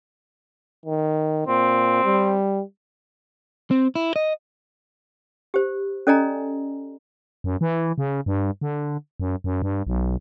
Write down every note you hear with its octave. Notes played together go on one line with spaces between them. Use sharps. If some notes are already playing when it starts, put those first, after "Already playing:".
D#3
A#2 C4
G3
C4
E4
D#5
G4 C5
C#4 A4 D5 D#5 G#5 A#5
F#2
E3
C#3
G2
D3
F#2
F#2
G2
B1